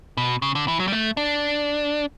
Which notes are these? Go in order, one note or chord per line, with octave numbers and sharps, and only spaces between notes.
B2
C#3
D3
E3
F#3
G3
A3
D4